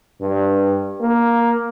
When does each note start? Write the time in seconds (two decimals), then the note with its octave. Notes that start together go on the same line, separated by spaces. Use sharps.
0.21 G2
1.01 A#3